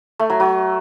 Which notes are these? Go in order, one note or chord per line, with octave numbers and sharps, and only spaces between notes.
A3
F#3
F#3